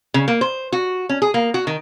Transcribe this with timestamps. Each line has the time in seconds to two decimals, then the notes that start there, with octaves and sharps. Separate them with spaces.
0.14 C#3
0.28 A#3
0.41 C5
0.72 F#4
1.09 C#4
1.22 G#4
1.34 A#3
1.54 F#4
1.67 D#3